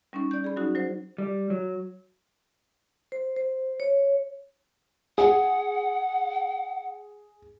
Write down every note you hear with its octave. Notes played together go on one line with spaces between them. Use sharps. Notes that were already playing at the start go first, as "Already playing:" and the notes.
G3 C#4 D#4 C#6
D5 G6
G#4 B5
F#3 C#4 D#4 F#4
F#3 C5
G3
F#3
C5
C5
C#5
G#4 F#5